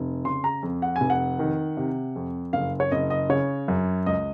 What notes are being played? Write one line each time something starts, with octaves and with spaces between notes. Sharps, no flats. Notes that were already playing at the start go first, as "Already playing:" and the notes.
Already playing: F1
C#3 C6
A#5
F2
F#5
G#5
F1
F#5
D#3
C3
F2
F#1 F5
C#5
F#1 D#5
D#5
C#3 C#5
F#2
C#2 D#5